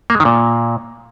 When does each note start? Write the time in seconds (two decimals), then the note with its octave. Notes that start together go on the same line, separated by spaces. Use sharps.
0.10 A#3
0.15 G#3
0.20 D#3
0.25 A#2